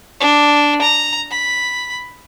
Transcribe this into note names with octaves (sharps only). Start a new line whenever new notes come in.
D4
A#5
B5